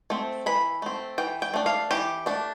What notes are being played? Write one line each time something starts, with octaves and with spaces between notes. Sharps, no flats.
A3 C4
E3 B5
A3 C4
E3 G5
G5
A3 D4
F5
E3 G4
A3 D4